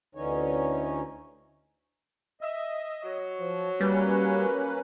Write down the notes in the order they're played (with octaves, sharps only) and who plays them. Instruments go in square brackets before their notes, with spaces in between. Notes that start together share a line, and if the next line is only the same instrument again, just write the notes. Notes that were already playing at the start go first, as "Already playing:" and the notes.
[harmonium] D2 D3 E3 C#4 D#4 C#5
[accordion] D#5 [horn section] E5
[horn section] F#3 C#5
[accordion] F3
[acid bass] G3 [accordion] A#3 C#4 B4